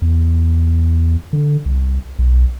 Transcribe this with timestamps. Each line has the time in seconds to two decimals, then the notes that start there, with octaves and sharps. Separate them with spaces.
0.02 E2
1.33 D3
1.66 C2
2.19 B1